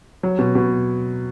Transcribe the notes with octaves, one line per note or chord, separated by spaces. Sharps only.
F#3
B2
B2